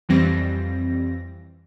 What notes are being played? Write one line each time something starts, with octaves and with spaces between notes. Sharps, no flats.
F2 E3 G3 C4 A#6